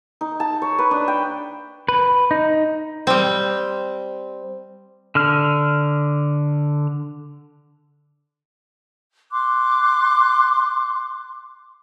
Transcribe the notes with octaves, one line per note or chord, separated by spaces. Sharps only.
D#4
A5
C#5
B4
D4
G5
B4
D#4
G3 C4
D3 F6
C6 D6 F#6